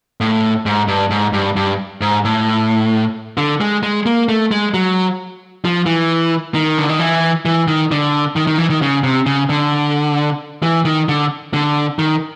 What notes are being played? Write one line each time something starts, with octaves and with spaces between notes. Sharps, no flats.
A2
G#2
G2
G#2
G2
G2
G#2
A2
D3
G#3
G#3
A#3
A3
G#3
F#3
F3
E3
D#3
D3
D#3
E3
E3
D#3
D3
D#3
D#3
E3
D#3
C#3
C3
C#3
D3
E3
D#3
D3
D3
D#3